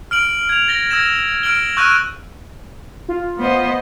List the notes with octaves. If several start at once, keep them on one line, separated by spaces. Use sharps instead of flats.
F6 D7 F#7
G#6 F7
A6 A#6 G7
E6 G#6 A#6 E7
F6 D7 F#7 G7
C#6 E6 F#6 G6 A#6 D#7
F4
B3 C5 D#5